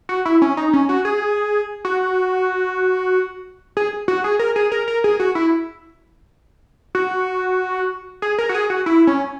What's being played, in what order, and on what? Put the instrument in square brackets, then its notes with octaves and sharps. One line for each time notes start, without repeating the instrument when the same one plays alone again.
[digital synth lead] F#4
E4
C#4
D#4
C#4
F#4
G#4
F#4
G#4
F#4
G#4
A#4
G#4
A#4
A#4
G#4
F#4
E4
F#4
G#4
A#4
F#4
G#4
F#4
E4
C#4